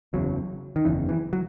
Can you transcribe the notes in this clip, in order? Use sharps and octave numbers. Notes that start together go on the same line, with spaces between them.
F#1 E2 C#3 F#3
D#3
F#1 E2 C#3 E3
E3
F#3